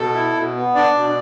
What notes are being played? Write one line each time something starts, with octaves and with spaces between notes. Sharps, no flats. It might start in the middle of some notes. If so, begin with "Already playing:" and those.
Already playing: B2 A4
E4
B2
B3
D4 D5
B2